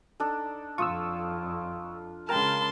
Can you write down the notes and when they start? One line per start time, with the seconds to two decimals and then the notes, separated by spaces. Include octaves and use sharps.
0.20 D4 D#4 A4
0.78 F2 F4 C#6 D#6 E6
2.29 C#3 G#3 A#4 G5 A5 A#5 C6 F6